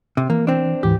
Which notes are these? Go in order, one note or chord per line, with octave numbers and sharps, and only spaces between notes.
C3
E3 A#3
C4 D4
D2 G#2 E3 G4